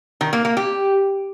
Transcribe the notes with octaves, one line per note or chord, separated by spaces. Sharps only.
D#3
A#3
A#3
G4